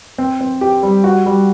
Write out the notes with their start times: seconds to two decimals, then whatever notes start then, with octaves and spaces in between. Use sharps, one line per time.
0.18 C4
0.41 C4
0.61 G4
0.83 G3
1.04 F#4
1.26 G3